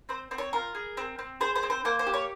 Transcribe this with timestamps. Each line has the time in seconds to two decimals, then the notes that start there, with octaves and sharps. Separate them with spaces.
0.09 C4 C5
0.31 C4
0.38 C#5
0.53 F4 A#4
0.75 G#4
0.97 C4
1.19 C4
1.40 G#4 C5
1.56 C5
1.63 C4
1.70 C5
1.85 A#3 C5
1.99 C5
2.07 G4
2.14 C#5